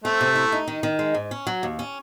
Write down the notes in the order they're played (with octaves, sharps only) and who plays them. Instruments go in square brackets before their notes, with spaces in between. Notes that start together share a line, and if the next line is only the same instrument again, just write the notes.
[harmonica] A3 [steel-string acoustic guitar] C4
[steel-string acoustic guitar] C3
E4
D#4
D#3
D#3
G#3
G#2
C#4
F#3
D#2
C#4